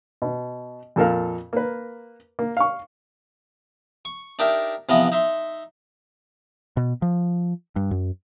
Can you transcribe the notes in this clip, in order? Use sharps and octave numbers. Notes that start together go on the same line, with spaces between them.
B2
F2 A#2 A4 A#4 F5
A#3 A#4 B4
A#3
F5 C#6
C#6
D4 D#4 G4 A#4 E5
C3 E3 F3 B3 D#5
D#4 E5 C6
B2
F3
G2
F#2